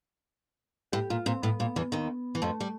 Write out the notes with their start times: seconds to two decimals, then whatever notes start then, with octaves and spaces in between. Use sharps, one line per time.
0.92 A2 G4
1.10 A#2 F4
1.26 A#2 C4
1.42 A2 B3
1.60 A#2
1.76 E2 E3
1.92 D#2 D#3
2.35 E3
2.42 F2 F3 A3
2.60 G3